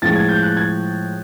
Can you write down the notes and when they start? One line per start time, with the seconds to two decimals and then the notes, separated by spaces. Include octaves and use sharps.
0.02 A2 F3 G#3 A6
0.16 G#6
0.29 G6
0.43 F#6
0.57 G#6